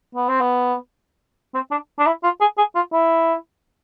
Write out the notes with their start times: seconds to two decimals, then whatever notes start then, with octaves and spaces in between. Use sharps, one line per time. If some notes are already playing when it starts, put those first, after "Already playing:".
0.15 B3
0.29 C4
0.41 B3
1.54 C4
1.71 D4
1.99 D4
2.06 E4
2.24 F4
2.41 G#4
2.58 G#4
2.75 F4
2.93 E4